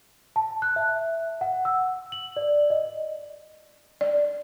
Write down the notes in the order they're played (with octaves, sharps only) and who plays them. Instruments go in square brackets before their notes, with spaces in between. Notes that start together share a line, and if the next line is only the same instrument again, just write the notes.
[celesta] A5
F#6
E5
F#5
E6
F#7
D5
D#5
[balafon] D5